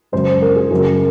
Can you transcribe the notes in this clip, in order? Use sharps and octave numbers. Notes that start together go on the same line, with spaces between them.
F#2 C#3 G#3 C5
A#4
G#4
F#2 C#3 F#3 A#4